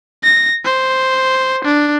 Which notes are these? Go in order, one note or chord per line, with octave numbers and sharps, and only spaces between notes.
A#6
C5
D4